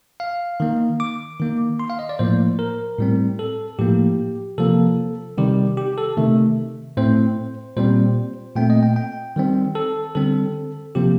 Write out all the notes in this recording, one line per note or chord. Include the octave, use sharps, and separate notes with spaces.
F5
D#3 A#3
D6
D#3 A#3
C6
F5
D#5
D5
A2 F3 A#3 C5
A#4
A2 G3 C4
A4
A2 F3 A#3 G4
C3 F3 A#3 A4
C3 D#3 G3 G4
G4
A4
C3 D#3 A3
A2 A3 C4 C5
A#2 G3 C4 C5
A#2 A3 C4 G5
D#5
G5
G5
D#3 G3 C4
A4
D3 G3 C4 A4
C3 F3 A#3 G4